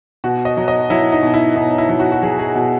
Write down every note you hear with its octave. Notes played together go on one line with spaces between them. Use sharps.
B2 F#4
D#5
F#3
D#5
F#3 E4
D#4
B2
E4
B2 D#4
E4
F#3
F#4
F#4
F#3 G#4
G#4
B2 F#4